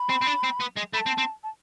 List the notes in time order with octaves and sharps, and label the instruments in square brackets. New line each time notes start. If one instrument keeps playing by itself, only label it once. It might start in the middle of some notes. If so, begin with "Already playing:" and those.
Already playing: [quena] B5
[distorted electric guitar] C4
C4
D4
C4
B3
G#3
[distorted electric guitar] A3 [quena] B5
[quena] A5
[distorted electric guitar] C4
C4
[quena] A5